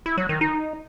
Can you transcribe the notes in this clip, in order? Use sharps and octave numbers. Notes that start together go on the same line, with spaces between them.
E4
F#3
D#3
D#4